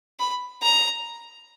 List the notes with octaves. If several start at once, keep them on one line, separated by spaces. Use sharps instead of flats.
B5
A#5